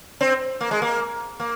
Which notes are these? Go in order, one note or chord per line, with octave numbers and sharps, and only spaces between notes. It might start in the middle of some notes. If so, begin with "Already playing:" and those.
C4
A#3
G#3
A#3
A#3